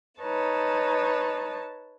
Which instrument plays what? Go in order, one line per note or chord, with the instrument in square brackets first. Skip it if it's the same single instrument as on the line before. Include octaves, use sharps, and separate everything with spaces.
[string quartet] D#4 B4 C#5 A5